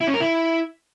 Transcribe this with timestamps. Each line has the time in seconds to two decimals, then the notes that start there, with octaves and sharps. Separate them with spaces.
0.01 E4
0.07 C#4
0.14 A#4
0.20 E4